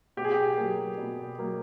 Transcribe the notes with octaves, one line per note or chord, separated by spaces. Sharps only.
B2 G4
G#4
G4
F#3 A#3
B2
F#3 A#3